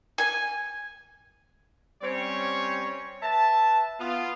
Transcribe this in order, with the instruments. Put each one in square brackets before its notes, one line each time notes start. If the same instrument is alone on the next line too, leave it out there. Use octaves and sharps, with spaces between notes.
[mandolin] G#5
[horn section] G3 C4 C#4 C#5
B4 E5 A5
B3 F4